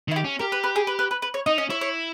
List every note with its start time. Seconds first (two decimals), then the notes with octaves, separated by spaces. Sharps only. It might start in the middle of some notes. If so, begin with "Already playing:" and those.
0.08 D#3 E4
0.16 G4
0.24 C#4
0.39 G4 A#4
0.52 B4
0.64 B4
0.76 G#4
0.87 B4
0.99 B4
1.11 B4
1.22 B4
1.34 C#5
1.46 D#4 D#5
1.58 C#4 D#5
1.70 E4 C#5
1.81 C#5